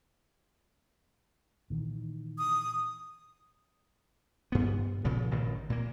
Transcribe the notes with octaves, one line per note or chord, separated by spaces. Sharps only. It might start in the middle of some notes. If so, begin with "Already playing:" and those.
A#2 D#3 E3
D#6
G2 B3
A#2 C#3 F3
A1 G2 A#2 D#3
A#2 A#3